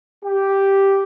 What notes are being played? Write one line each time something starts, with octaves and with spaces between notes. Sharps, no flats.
G4